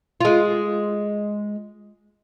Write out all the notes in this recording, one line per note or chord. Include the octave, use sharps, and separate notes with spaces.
G#3 F4